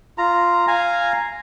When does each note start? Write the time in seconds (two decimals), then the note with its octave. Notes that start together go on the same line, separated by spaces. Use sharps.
0.18 F4 A#5
0.68 F5 G#5 A#5